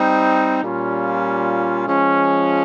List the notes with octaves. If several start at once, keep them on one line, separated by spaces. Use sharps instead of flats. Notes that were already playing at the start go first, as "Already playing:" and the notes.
Already playing: G3 C4 D#4
A#2 G3 C#4 F4
F3 G#3 C#4